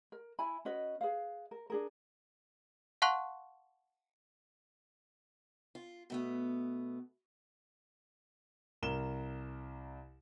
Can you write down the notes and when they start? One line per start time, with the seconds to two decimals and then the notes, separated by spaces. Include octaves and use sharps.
0.12 A#4
0.39 E4 G#5 B5
0.65 C#4 F#4 B4 D#5
1.01 G#4 B4 F5
1.51 A#4
1.70 D4 G#4 A#4
3.02 F5 F#5 A5 C6 C#6 F#6
5.75 F4
6.10 B2 A3 B3
8.82 C2 A#4 E7 G7